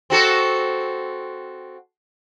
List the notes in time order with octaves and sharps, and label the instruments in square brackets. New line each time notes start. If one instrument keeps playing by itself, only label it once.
[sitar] C4 F#4 A4